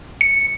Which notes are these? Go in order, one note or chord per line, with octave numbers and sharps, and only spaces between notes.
C#7